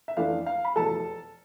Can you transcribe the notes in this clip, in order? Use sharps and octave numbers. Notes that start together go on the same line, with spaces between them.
E5
F2 E3 A3 D4 F5
F5
B5
F1 E2 B2 A4 A5